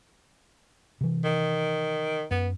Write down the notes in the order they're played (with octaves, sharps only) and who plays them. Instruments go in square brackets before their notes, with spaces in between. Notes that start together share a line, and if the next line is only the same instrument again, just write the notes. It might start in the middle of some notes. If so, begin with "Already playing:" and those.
[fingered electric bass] C3 E3
[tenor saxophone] D#3
[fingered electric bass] F#2 [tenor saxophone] B3